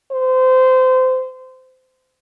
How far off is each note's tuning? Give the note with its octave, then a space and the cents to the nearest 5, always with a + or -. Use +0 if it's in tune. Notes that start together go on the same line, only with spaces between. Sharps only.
C5 -25